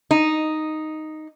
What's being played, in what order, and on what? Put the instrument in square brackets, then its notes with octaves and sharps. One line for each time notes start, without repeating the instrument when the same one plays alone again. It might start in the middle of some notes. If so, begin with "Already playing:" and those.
[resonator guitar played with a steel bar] D#4